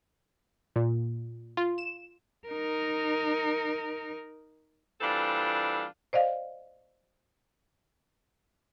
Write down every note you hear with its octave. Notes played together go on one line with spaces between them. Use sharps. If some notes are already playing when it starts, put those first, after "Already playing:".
A#2
F4
E7
D#4 A#4
E3 G3 C4 D4 F4 A4
C5 D5 D#5 F5